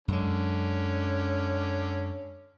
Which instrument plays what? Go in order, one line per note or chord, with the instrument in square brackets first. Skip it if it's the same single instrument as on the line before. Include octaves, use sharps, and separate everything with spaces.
[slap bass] F#2 G#3 [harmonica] D3 C#4